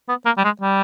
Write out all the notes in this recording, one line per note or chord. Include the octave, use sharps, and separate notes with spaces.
B3
A#3
G3
G#3
G3